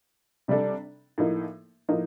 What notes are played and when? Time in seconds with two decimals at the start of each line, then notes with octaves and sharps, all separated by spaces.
0.48 C3 G3 D4 A4
1.18 A2 F3 A#3 D#4
1.89 A2 F3 A#3 D#4